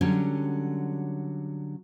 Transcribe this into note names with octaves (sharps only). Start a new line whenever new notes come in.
D3 F#3 G3 C#4